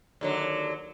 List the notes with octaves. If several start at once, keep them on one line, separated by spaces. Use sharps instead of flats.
D#2 D3 F#3